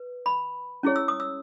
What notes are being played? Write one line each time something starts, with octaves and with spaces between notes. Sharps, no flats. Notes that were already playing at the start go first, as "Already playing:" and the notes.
Already playing: B4
B5
C#4 E4 G#4 C#5
E6
D#6
E6